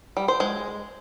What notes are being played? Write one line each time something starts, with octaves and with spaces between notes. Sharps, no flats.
G3
C5
G#3